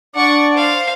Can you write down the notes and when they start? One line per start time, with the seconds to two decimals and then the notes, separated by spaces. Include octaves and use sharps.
0.15 D4 D5 F#5 C#6
0.54 C5 F5